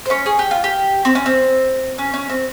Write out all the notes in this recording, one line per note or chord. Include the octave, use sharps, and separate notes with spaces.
C5
C#4 C#5
G#4
G4
F4
G4
C4
C#4
C4
C#4
C#4
C4